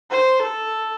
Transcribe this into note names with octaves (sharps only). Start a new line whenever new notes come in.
C5
A4